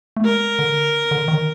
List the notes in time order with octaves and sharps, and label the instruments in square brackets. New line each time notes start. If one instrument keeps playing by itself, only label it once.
[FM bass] A3
[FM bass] G#3 [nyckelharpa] A#4
[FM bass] D3
D3
D#3